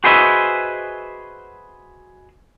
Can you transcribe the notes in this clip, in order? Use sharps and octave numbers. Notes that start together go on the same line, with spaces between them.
F#4 G#4 B4 C5 D#5 E5